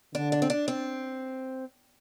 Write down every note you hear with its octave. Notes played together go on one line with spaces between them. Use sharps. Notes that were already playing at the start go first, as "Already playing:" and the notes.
D3 D4
D4
C4
D4
C4